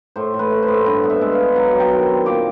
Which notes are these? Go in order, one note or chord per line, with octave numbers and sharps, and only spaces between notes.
A2 C5
A2
B4
A3
C5
A2
G2 B4
B3
E5
G#3
F5
G#3
F#3 F#5
F#3
G5
D#3
C4
A#2 D6